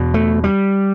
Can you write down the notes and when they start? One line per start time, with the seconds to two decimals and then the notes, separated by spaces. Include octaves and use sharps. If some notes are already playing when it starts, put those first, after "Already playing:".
Already playing: E2 B2
0.14 A3
0.44 G3